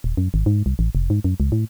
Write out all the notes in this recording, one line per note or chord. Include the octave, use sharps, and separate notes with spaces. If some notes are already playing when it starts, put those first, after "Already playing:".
D#1
F#2
G#1
G#2
C2
A1
F1
G#2
F#2
C#2
A2